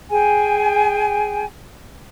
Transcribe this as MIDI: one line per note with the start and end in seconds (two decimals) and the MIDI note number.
0.10 1.44 68
0.10 1.44 79
0.10 1.44 80